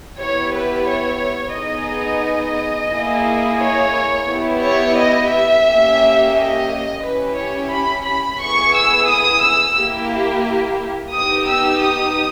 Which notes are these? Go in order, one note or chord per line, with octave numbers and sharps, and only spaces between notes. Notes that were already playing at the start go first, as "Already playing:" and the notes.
B3 E4 G4 C#5
B4
C#5
B3 D#4 G#4 D#5
A#3 E4 G#4
C#5
B3 E4 G4
C#5
D#5
E5
A#3 C#4 G4
D#5
C#4 E4 G4 B4
C#5
B5
B5
B3 E4 G#4 C#6
E6
D#6
E6
A#3 E4 G4
B3 D#4 G4 D#6
E6
D#6